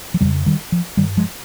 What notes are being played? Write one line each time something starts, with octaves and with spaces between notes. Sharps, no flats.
F3
F2 C#3 D#3 G3
D#3 G3
F3
G2 D#3 G3
F3 G#3